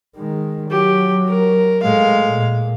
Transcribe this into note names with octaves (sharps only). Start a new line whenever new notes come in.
D#3 G#3
F#3 G4
A#4
A2 G#3 A3 F5
A#2